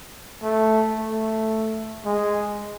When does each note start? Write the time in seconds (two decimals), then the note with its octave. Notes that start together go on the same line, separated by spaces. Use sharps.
0.43 A3
0.98 A3
2.06 G#3